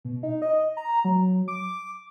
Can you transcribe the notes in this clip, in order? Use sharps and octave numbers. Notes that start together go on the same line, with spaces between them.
B2
D#4
D#5
A#5
F#3
D6